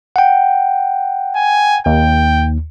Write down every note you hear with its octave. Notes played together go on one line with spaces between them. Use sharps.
F#5 G5
G#5
D#2 G5